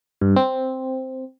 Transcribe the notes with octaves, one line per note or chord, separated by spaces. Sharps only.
G2
C4